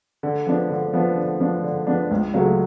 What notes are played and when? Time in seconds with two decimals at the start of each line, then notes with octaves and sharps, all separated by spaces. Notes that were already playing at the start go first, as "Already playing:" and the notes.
0.23 D3
0.47 F3 B3 D4
0.70 D3
0.93 F3 B3 D4
1.17 D3
1.40 F3 B3 D4
1.64 D3
1.87 F3 B3 D4
2.11 C#2
2.34 C#3 F#3 A3